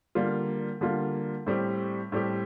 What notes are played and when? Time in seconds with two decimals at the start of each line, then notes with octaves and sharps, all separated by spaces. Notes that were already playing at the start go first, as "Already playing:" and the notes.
0.15 D3 G3 A#3 F4
0.81 D3 G3 A#3 F4
1.47 A2 G3 C4 G4
2.12 A2 G3 C4 G4